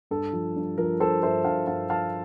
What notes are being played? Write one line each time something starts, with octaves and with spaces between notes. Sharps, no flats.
G2 A4
F3
G2
F3 A#4
G2 A4 C5
G2 C5 E5
G2 F5 A5
G2 F5 A5
F3 F5 A5